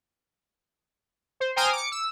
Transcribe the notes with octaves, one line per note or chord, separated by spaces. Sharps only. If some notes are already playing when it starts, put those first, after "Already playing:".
C5
C5 G5 G#5 A#5 D#6 F6
D6 C#7
E6